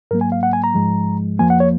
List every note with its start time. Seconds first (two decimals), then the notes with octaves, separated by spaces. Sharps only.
0.11 G#2 F#3 A#3 A#4
0.21 G#5
0.32 F5
0.43 F#5
0.53 G#5
0.64 A#5
0.75 G#2 F3 G#3
1.39 F2 F3 A#3 G#5
1.50 F#5
1.60 C#5